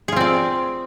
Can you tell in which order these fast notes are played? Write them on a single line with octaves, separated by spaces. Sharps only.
G#4 F4 C4 D5